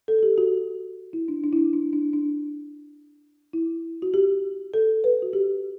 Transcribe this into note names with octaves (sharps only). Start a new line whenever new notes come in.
A4
A4
G4
F#4
E4
D4
D4
E4
D4
D4
D4
D4
E4
F#4
G4
A4
B4
F#4
G4